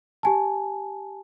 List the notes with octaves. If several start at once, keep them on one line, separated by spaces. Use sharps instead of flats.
G4 G#5 A5